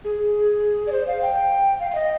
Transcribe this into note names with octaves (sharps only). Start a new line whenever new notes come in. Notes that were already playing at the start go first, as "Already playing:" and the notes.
G#4
D5
C5
F5
G5
F5
F5
D#5